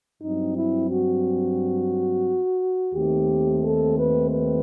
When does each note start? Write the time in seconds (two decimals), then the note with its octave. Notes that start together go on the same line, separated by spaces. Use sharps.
0.22 G2 F#3 C4 D#4
0.56 E4
0.90 F#4
2.94 D#2 D#3 A3 C4 G4
3.64 A4
3.97 B4
4.31 B4